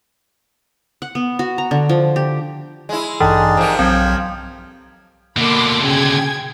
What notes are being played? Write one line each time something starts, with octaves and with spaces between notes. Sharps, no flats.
F#5
B3
F#4
A#5
D3
F3
G4
G#3 E4
A1 G2 E3 D4 D#4 G#4 A6
C3 F3 A#3
B1 F#3 C4 G5 G#6
B2 D3 A#3 B5 C6 D6
C#3 G#4 G5 G#6